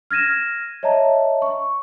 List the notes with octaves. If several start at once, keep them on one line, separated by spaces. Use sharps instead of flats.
F6 G#6 A#6 D#7 E7
C#5 D#5 E5 A5 A#5
C#6